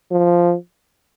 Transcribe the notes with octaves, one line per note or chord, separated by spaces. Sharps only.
F3